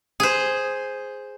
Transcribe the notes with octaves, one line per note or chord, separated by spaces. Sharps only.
G#4 C5